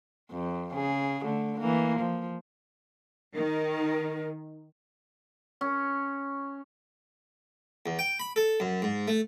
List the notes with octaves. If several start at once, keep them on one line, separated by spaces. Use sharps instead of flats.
F2
C#3 G#4
D3 A3
E3 A#3
F3
D#3 A#4
C#4
E2
G5
B5
A4
F#2
G#2
A3